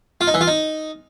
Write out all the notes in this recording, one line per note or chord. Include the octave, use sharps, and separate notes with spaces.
F4
D#4
E3
F4
D#4